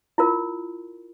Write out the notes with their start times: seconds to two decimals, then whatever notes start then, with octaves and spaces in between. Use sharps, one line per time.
0.18 E4 F4 A#4